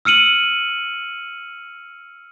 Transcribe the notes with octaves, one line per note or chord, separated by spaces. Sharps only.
E6 F6 C#7 D#7 F#7